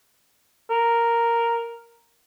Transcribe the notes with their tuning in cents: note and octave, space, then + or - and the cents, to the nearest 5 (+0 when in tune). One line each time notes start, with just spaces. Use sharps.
A#4 +0